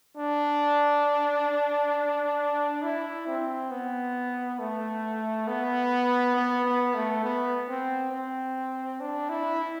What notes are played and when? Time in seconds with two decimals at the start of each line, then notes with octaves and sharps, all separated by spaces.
0.17 D4
2.82 E4
3.27 C4
3.71 B3
4.59 A3
5.47 B3
6.35 B3
6.64 B3
6.94 A3
7.23 B3
7.68 C4
8.12 C4
9.00 D4
9.29 E4